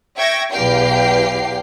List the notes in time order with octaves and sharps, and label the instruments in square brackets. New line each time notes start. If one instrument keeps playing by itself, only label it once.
[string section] E5 G5 C#6 G#6 A#6
B1 E2 G4 F5 G5 C7